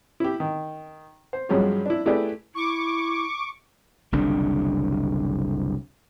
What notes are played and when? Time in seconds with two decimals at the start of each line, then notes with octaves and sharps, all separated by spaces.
0.20 E4 G4
0.40 D#3
1.33 C5
1.49 G2 F3 F#3 G#3 C#4 G4
1.86 D4 E4
2.06 A3 E4 G4 G#4 B4 D5
2.55 E4 C#6 D6
4.12 F#1 C2 D3 D4